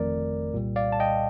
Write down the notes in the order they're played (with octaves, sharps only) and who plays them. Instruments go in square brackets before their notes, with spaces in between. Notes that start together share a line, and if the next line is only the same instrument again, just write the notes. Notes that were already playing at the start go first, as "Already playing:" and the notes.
Already playing: [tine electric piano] G1 F2 D#3 A3 A#4 D5
C2 A#2 G3
D5 F5
A5
D#5 G5